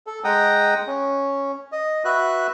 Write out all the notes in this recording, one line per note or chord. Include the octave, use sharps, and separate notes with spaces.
A4
G#3 F#5 G5 A#5 D#6
C#4
D#5
F#4 B4 E5 F#6